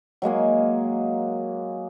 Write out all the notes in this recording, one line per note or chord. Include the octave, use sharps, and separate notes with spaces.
F#3 G#3 A#3 G#4